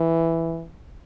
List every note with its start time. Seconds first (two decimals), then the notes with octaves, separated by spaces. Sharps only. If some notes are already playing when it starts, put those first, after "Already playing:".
Already playing: E3